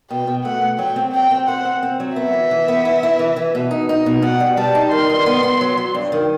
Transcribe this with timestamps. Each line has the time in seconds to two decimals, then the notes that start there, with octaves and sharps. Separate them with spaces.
0.10 B2 G5
0.27 B2
0.45 A3 F#5
0.61 A3
0.78 F#3 G5
0.96 C4
1.13 C4 G5
1.31 C4
1.48 C5 F#5
1.65 C4
1.83 C4
2.00 F#3
2.16 B3 E5
2.33 E3
2.51 E3
2.68 B3
2.85 E4
3.03 E4
3.19 E3
3.36 E3
3.55 B2
3.71 D#4
3.89 D#4
4.06 B2
4.22 B2 F#5
4.40 G3
4.57 G3 A5
4.75 D#4
4.91 D#3 C6
5.09 G2
5.26 B3
5.43 B3
5.61 F#3
5.77 F#3
5.95 G2
6.12 D#3